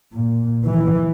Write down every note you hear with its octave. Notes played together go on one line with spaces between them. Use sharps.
A#2
E3